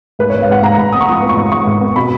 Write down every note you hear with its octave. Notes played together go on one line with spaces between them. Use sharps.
G#2 B4
C#5
G#2
F5
G#2 F#5
G#2 A#5
G#2 B5
B3 D#6
C#6
F3 D#6
B3
C#6
G#2
G#2 C#6
G#2
B3
B2 B5